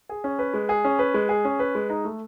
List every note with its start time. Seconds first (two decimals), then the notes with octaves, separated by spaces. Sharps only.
0.09 G#4
0.24 C#4
0.39 B4
0.54 G#3
0.69 G#4
0.84 C#4
0.99 B4
1.14 G#3
1.29 G#4
1.45 C#4
1.59 B4
1.75 G#3
1.90 D#4
2.05 A3